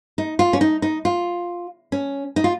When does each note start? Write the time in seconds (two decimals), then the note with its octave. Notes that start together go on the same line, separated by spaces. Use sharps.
0.18 D#4
0.39 F4
0.53 C#4
0.61 D#4
0.82 D#4
1.05 F4
1.92 C#4
2.36 D#4
2.44 F4